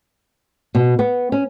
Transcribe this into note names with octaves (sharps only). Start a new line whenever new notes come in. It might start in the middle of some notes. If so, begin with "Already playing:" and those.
B2
B3
C#4